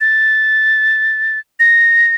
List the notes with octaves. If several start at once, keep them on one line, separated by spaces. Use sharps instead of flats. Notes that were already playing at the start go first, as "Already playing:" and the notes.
A6
A#6